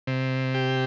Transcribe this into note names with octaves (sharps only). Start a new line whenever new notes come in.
C3
G4